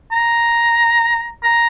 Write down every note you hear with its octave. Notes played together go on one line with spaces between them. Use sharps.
A#5
A#5